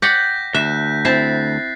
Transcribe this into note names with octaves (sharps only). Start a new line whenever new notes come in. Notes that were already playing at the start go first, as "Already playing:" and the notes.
D5 F#5 G5 G6 A#6 B6
D2 E5 F#6
C4 E4 A5 A6 B6 C7